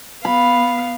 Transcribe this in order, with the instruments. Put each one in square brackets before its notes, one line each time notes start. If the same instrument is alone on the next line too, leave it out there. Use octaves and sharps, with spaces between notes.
[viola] B3 F5 [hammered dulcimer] B5